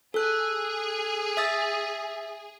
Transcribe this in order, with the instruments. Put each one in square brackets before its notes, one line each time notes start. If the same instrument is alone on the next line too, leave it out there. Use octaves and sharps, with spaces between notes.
[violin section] G#4 [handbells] A4 F#6
[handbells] E5 D#6 A6